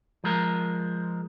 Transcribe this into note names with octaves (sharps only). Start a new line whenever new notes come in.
F3 G#3 A#4